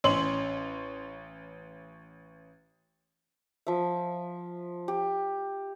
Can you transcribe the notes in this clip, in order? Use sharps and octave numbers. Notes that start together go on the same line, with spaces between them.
A1 C#4 C#5 C6 F#7
F3 E5
G4